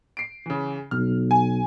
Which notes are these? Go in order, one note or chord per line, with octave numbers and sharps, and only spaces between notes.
C7 D7
C#3 E3
B1 F6
G#5